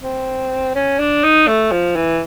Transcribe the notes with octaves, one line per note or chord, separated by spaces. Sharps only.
C4
C#4
D4
D#4
A3
F3
E3